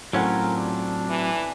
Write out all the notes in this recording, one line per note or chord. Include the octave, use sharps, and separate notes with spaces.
A2 F#3 C4 C#4 F4 A#4 F#5
D4
E3